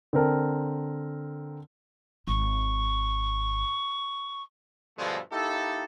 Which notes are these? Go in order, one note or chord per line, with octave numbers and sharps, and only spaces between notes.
D3 C4 A#4 A5
G#1 C#6
G2 B2 D3 F3 G#3 A3
A#3 D#4 E4 G4 A4